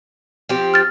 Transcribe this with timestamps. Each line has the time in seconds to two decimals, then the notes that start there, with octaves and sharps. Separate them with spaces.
0.49 F3 C4 G4
0.74 F6 A6